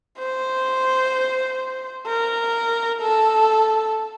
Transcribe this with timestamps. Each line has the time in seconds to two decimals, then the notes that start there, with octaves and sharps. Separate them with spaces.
0.18 C5
2.07 A#4
3.01 A4